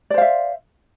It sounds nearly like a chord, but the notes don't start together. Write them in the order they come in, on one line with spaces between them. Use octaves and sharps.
D5 C5 F5 E5